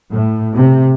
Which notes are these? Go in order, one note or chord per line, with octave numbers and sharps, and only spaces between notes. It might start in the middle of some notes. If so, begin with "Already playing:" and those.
A2
C3